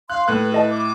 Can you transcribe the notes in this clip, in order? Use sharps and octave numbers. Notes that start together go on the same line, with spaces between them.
F5 C6 F#6
A2 A4 B4 F#6
E4 A4 D#5 A5
D6